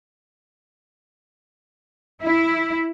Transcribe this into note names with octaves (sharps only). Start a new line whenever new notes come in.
E4